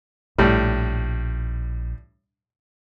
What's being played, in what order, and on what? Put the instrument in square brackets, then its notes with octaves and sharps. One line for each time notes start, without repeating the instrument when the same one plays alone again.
[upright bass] A#1 [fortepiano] A2 G3